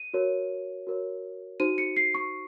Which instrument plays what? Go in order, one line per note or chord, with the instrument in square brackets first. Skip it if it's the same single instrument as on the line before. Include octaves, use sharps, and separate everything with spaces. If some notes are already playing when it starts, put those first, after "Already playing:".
Already playing: [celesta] D#7
F#4 A#4 C#5
F#4 A#4 C#5
D#4 F#4 C5 D#7
C#7
C7
C#6